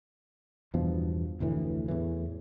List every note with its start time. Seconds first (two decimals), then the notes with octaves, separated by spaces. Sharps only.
0.74 E2 G2 B2 F3
1.40 F1 D2 A2 E3
1.88 E2 A2 E3